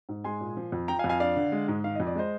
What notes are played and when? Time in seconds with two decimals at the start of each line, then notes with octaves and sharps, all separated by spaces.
0.09 G#2
0.24 G#3 G#5 C6
0.41 A#2
0.57 F3
0.72 F2
0.88 F3 G5 A#5
0.99 F5 G#5
1.04 F2
1.09 F5 G#5
1.20 D4 D5 F5
1.36 D3
1.52 G#3
1.68 G#2
1.84 D#3 F5
1.95 F2 D#5
2.07 D5
2.15 G#3 C5 D#5